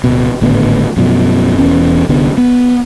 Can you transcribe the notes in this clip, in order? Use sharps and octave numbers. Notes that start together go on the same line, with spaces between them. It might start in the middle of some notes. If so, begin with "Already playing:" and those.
D1 B2
G#1 A2 D3 B3
F#2 B2 F3
E1 E2 B3 C#4
C2 D3 B3 D4
B3